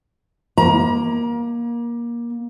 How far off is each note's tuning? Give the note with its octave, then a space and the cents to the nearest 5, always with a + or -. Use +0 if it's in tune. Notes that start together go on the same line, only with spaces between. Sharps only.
A#3 +20 A#5 +35